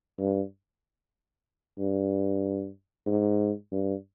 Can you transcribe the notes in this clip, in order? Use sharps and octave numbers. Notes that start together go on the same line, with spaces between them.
G2
G2
G#2
G2